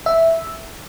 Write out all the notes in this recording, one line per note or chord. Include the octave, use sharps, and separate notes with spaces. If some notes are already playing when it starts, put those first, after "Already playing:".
E5